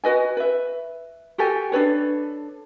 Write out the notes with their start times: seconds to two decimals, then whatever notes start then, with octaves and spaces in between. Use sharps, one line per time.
0.04 F#4 B4 D#5 G#5
0.37 B4 E5
1.38 F#4 G4 A4 G#5
1.72 D4 A4 B4 C#5